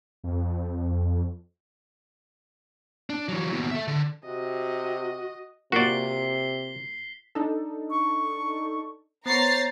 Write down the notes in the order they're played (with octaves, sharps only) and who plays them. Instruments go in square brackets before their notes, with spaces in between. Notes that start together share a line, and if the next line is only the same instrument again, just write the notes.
[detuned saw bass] F2
[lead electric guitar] D4
E3 F#3
D#2 B2
A4 E5
D3
[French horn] C3 [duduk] F#4 [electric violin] D#5
[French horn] C3 [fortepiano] A#3 F4 [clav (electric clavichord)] F#4 D5 [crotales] B6 C7 G7
[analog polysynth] D4 D#4 A4
[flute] C#6
[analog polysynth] B3 C#5 [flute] C5 [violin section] A#5 A6 C7